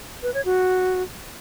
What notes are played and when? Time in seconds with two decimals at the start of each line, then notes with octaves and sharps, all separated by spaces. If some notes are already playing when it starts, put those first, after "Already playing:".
0.23 B4
0.34 C#5
0.45 F#4